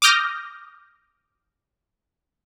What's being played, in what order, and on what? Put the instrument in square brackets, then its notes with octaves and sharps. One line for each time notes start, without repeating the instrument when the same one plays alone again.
[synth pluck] D6 D#6 F6 G6 A#6